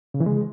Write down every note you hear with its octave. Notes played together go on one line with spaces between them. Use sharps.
C#3
E3
G#3